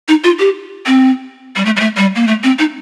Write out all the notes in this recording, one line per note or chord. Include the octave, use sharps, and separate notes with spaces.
D#4
F4
G4
C4
G3
A3
G3
A3
G3
A#3
A3
C4
D#4